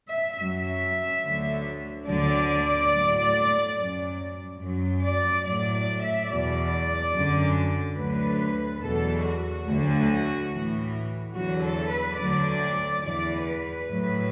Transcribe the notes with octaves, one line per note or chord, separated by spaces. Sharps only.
E5
F#2 F#3 E5
D2 D3 F#3
D2 D3 F#3 D5
A2 F#3
F#2 F#3
F#2 F#3
D5
A2 F#3 D5
D5
E5
E2 B2 F#3 D5
F#2 D3 F#3
D2 D3 F#3 B4
E2 B2 F#3 A4
F#4
D2 D3 F#3
A2 E3
E2 D3 F#3 F#4
A4
B4
D2 D3 F#3 D5
E2 E3 D5
B4
A2 F#3